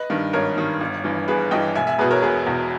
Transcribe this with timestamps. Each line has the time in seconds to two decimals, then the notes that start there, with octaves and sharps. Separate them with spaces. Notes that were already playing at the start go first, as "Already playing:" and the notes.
Already playing: B4 D#5
0.10 G2 D#3
0.33 G#1 A#4 C#5
0.57 G2 D#3
0.81 G1
1.04 G2 E3
1.28 G1 G#4 B4
1.51 G2 E3 D#5 G5
1.75 E1 E5 G#5
1.87 E5 G#5
1.99 E2 B2 G#4 B4
2.11 A#4 C#5
2.22 E1 G#4 B4
2.46 E2 B2